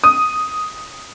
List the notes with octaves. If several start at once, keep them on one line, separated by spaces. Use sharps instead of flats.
D#6